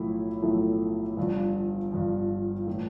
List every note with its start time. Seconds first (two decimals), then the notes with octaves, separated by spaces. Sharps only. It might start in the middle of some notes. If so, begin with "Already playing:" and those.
Already playing: B1 A2 F3 A3 E4
0.42 B1 A2 F3 A3 E4
1.16 G1 G2 F3
1.92 G1 G2 F3
2.67 A2 E3